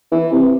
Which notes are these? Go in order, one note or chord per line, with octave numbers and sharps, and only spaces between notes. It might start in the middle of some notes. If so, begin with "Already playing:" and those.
E3
C3